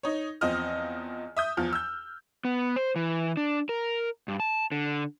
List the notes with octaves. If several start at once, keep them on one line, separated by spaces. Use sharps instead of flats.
D#4 C#5
E2 F3 C4 D#5 F6
E5 D#6 G6
E2 F3 F6
E6 G6
B3
C5
E3
D4
A#4
G2
A5
D3